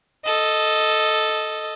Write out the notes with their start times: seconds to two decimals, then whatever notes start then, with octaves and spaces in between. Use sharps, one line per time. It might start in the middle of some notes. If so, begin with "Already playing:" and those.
0.25 A4 D#5